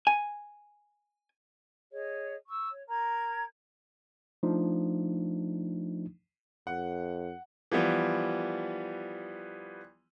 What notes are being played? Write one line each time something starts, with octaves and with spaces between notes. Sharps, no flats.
G#5
G#4 C#5 D#5
C#6 E6
C#5
A#4 A#5 G#6
F3 A3 D4 D#4
F2 F#5
E3 F3 G3 B3